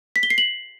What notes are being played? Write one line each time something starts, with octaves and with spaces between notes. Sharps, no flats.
B6
G7
C7
F#7